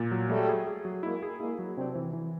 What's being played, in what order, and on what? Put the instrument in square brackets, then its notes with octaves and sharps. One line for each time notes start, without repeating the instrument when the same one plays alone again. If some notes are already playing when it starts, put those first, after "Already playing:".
Already playing: [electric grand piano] A#2
F#3
[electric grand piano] F#3 [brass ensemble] G3 A3
[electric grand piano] G#4
G#4
F#3
[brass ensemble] G#3 A#3 [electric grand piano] E4
[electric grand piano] G#4
[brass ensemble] G#3 A#3 [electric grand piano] E4
[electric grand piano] F#3
[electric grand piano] C3 [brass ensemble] C4 D4
[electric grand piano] E3
E3